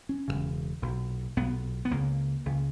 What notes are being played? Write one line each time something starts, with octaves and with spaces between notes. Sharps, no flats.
C#4
E1 D#2 C#3
B1 A#2
B1 A#2 B3
B3
C#2 C#3 A#3
C#2 C#3